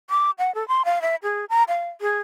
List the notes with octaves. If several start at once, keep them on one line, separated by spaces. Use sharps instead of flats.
D6
F#5
A4
C6
F5
E5
G#4
A#5
F5
G#4